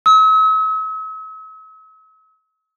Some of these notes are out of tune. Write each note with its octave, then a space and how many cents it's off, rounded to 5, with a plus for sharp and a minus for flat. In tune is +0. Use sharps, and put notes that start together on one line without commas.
E6 -45